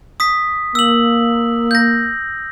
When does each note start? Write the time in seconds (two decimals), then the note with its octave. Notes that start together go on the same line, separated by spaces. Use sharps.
0.20 D#6 B6
0.75 A#3 E6 F#7
1.71 G6 A#6